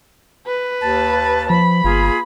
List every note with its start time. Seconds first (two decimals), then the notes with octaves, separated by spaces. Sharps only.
0.47 B4
0.82 D#2 A5
1.50 F3 B5
1.84 G1 A#3 F4 G#4